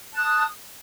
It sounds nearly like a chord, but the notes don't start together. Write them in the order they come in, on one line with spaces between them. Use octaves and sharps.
A5 F#6 D#6